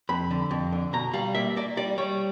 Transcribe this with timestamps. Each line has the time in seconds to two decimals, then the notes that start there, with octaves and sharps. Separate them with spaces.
0.09 F2 B5
0.31 D3
0.51 F2
0.72 D3
0.93 B2 A#5
1.13 G3 F5
1.35 A#3 E5
1.56 A#3 D5
1.77 G3 D5
1.98 G3 C#5